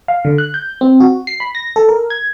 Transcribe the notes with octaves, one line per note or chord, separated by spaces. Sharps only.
F5
D3
F#6
G6
C4
F#4
C7
B5
A#6
A4
A#4
G#6